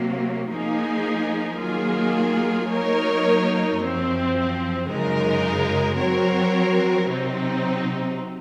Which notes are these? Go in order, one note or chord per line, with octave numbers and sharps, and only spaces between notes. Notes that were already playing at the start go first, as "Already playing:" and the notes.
Already playing: C3 F#3 A#3
F3 A#3 D#4 G#4
D#3 F#3 A#3 F4 G#4
F#3 A#3 D#4 A#4 C#5
F#2 F3 C4
F#2 C#3 G#3 D#4 A#4
F#3 C4 F#4 A#4 C#5
C3 F#3 C4 D#4